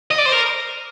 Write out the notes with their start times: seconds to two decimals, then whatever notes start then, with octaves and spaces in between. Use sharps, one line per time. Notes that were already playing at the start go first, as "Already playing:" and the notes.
0.11 D#5
0.18 D5
0.26 C5
0.32 A#4